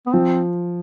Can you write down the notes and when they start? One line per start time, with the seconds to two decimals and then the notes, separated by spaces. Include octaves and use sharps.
0.06 B3
0.13 F3 C4